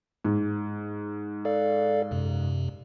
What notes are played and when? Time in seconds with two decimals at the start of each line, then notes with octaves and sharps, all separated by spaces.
0.25 G#2
1.45 A4 D5 F5
2.11 F#2 C3